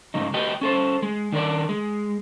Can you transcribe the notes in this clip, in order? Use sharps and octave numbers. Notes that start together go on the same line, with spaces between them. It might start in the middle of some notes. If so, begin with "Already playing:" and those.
G#2 C#3 F#3 D#4
F#4 G4 B4 D#5 G5
C#4 A4 C5
G#3
D#3 D4 A#4 D5
G#3